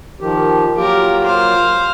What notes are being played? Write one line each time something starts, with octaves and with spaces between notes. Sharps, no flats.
D#3 F3 G4
F#3 A#3 F4 G4 A#4
C5 F5